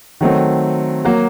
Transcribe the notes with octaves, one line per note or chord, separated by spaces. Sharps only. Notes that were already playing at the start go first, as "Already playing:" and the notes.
D#3 F#3 A3 C4
F#3 A#3 F#4